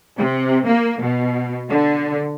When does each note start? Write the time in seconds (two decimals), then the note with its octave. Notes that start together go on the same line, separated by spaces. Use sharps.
0.17 C3
0.66 A#3
1.02 B2
1.70 D3